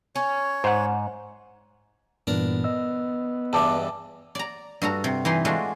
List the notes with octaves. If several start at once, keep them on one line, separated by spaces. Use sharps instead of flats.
C#4 C#5
G#2 C5 F#5
G2 A#2 E3 B3 D4 A#4
D#5 E6
E2 G2 E3 A5 D6
D5 A#5
G2 F#4 A4 A#5
C3
E3 D#4 C6
G#3 A3 D4 F4 F#4